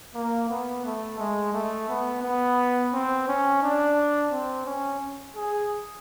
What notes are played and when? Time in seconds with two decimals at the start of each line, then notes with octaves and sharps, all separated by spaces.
0.15 A#3
0.50 B3
0.85 A3
1.19 G#3
1.54 A3
1.89 B3
2.23 B3
2.93 C4
3.28 C#4
3.63 D4
4.32 C4
4.66 C#4
5.36 G#4